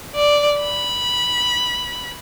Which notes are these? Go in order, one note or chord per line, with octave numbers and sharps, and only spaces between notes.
D5
B5